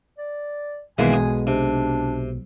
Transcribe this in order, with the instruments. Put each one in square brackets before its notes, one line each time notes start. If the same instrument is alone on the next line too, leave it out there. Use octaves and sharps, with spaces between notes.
[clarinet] D5
[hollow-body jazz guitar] B1 B2 G#3 [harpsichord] D#3 E3 A#3 [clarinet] G#5
[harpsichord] D#6
[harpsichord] C3 [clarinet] D4